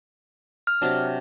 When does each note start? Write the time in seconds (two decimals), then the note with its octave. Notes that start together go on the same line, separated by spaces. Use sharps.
0.67 F6
0.82 C3 F#3 D4